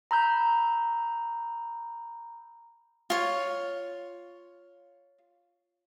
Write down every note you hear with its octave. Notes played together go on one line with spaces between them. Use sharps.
A#5 B5 E6 G6
F4 C#5